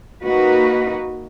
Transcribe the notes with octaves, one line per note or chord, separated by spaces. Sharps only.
A#3 D#4 F#4 B4